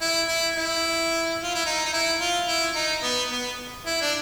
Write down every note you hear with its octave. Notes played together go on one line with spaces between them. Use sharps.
E4
E4
E4
F4
E4
D#4
D#4
E4
F4
E4
D#4
B3
B3
E4
D4